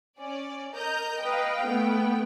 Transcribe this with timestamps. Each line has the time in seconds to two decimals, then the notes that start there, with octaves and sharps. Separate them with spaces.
0.19 C#4 D5
0.74 A#4 D#5 A#5 G6
1.21 B4 D#5 F5 G5
1.65 A3 B3